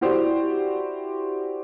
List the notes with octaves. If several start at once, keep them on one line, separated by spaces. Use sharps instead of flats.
E4 F#4 G4 C5 D5